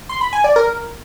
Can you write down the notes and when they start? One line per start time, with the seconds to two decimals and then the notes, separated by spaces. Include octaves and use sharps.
0.09 C6
0.21 B5
0.33 G#5
0.44 D5
0.56 A#4